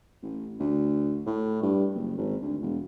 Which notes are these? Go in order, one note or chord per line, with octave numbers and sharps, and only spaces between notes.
A1
D2
A2
G2
F#1
G#1
D2
E1